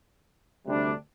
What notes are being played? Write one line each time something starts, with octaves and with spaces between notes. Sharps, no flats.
D2 C3 G3 D4